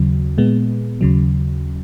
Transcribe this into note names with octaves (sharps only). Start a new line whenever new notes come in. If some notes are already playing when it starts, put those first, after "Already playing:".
Already playing: D#2 C#3 F#3
A#2 G#3 B3
D#2 C#3 F#3